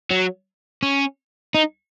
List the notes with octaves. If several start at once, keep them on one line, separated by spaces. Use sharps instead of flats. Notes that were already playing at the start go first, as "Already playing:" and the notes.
F#3
C#4
D#4